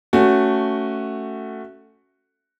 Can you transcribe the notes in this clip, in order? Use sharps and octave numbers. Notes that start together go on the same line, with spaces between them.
A3 C#4 F#4